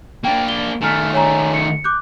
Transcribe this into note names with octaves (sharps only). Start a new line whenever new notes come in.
A#3 D4 G5
G7
D#3 A3 G#5 F6
C#5 G#5 A#5
C#7
D6 F#6 G6